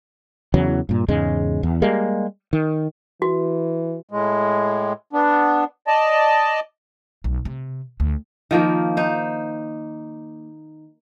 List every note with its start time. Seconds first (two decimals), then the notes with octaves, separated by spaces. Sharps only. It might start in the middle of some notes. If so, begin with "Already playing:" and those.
0.54 E2 C#3 E3 F#3
0.89 G2 A#2
1.08 E2 G#2 C#3 G#3
1.63 E2
1.82 G3 G#3 A#3
2.53 D#3
3.22 E3 F#4
4.11 A2 G#3
5.13 B3 D4
5.87 D5 D#5 A5
7.24 B1
7.45 C3
8.00 D2
8.51 D#3 F3 A#3
8.97 D#4 C5